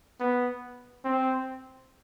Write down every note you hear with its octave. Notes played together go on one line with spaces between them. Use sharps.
B3
C4